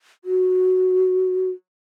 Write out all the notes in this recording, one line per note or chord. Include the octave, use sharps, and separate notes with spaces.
F#4